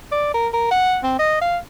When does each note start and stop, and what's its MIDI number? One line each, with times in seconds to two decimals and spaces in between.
0.12 0.33 74
0.34 0.48 70
0.54 0.68 70
0.72 0.98 78
1.04 1.14 60
1.19 1.37 75
1.42 1.57 77